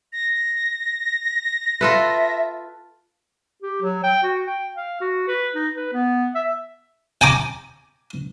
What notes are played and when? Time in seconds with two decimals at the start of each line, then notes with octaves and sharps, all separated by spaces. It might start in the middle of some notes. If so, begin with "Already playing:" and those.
0.13 A#6
1.81 F4 A4 B4 E5
3.63 G4
3.82 F#3
4.04 G5
4.23 F#4
4.47 G5
4.77 F5
5.01 F#4
5.28 B4
5.55 D#4
5.76 B4
5.93 B3
6.35 E5
7.21 G5 G#5 A#5 D6